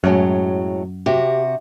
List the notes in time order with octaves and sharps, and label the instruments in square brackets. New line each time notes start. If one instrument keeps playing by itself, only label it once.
[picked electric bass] F#2 [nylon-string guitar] A2 F#3 G#3
[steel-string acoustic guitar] C3 F#4 [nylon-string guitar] G4